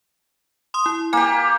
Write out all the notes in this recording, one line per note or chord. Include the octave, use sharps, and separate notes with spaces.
C6 D#6
E4
A#3 G4 G#5